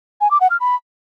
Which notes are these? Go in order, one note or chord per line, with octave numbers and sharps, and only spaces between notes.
G#5
D6
F#5
F6
B5